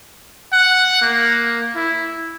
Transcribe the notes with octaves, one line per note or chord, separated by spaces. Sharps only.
F#5
A#3
E4